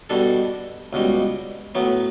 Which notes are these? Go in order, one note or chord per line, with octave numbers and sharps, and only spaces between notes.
B2 G3 D4 A4
C#2 B2 G3
A2 F#3 B3